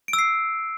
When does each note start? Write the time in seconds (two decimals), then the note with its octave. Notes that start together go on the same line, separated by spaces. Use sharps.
0.08 D7
0.13 E6
0.19 C7